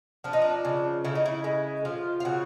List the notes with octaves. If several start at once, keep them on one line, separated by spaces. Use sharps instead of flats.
F3 D4
D#4
D4
C#3
C#3 E4
D#4
E4
G#3
F3 F4
F4
C#3 F#4